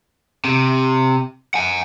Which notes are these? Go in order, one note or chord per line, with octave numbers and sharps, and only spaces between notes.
C3
F#5 G#5